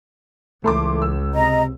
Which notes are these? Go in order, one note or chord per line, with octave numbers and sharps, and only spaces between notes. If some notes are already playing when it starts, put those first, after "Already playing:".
C#2 E3 A3 C6 D6
E6
C3 D#5 A#5